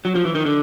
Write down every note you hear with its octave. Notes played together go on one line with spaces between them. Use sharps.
F#3
F3
E3
D#3
D3